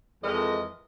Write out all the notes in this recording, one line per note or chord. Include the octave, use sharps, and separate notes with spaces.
F2 E3 G#3 A#4 D#5